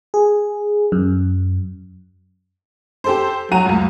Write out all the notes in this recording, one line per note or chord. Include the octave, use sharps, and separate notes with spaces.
G#4
F#2
G4 A4 C5
F#3 F#4 A#5 D#7
C#2 F#2